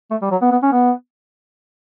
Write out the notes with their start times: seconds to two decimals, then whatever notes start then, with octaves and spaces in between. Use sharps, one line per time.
0.11 A3
0.22 G3
0.31 F#3
0.42 B3
0.52 B3
0.63 C#4
0.73 B3